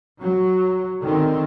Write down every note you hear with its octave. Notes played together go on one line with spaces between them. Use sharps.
F#3
D3 D#3 C4